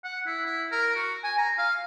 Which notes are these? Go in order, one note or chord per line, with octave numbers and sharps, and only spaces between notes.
F#5
E4
E4
A#4
F#4
G#5
A#5
F5